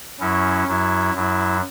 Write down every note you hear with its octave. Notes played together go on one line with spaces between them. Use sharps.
F#2 F#3 C#4 E4
F#2 F#3 E4
F#2 F#3 E4